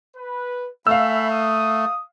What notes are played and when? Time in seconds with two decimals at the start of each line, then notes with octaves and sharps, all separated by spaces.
0.16 B4
0.87 A3 E5 F5 G#5 B5 E6
1.31 D#6